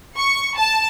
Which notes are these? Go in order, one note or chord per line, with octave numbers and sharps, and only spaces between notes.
C#6
A5